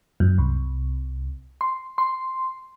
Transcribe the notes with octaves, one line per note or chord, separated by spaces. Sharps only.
F#2
C2
C6
C6